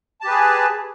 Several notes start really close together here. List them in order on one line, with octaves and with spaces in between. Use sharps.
A5 G4 B4 G#4